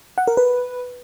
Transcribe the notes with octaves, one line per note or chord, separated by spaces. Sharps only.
F#5
A#4
B4